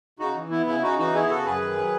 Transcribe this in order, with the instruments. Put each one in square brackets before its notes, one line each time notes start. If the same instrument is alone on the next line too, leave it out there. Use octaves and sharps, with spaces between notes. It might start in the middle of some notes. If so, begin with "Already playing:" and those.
[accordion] C#3 D#4 F#4
E3
B3 E4
C#3 E4
C#3 D#4 F#4
E3 D#4 F#4
B3 E4 G#4
C#3 F#4 A4
F#2 G#4 B4
D#3
F#3